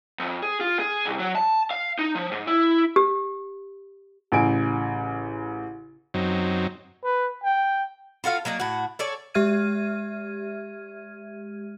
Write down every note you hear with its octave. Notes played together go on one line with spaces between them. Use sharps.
F2
G#4
F4
G#4
C2
F#3
A5
F5
D#4
F3
G#2
E4
G4
A1 C#3 G#5 D7
F#2 F#3 C4 D#4
B4
G5
F4 F#4 A4 F5
F#3 A#3 D#4 D5
A2 F#4
A4 C#5 D5 G#5
G#3 G4 E5 F6 G#6 D#7